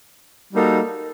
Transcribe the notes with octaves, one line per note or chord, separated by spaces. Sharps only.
G3 A#3 D#4 F#4 A4